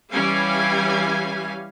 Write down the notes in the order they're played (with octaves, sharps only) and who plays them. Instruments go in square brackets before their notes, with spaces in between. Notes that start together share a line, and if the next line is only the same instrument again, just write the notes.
[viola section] E3 G3 C#4 F5 G#5